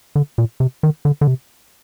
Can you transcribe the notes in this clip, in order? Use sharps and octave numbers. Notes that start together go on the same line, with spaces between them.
D3
A#2
C3
D#3
D3
D3
C3